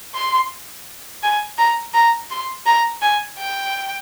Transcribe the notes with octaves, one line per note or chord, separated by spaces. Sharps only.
C6
G#5
A#5
A#5
C6
A#5
G#5
G5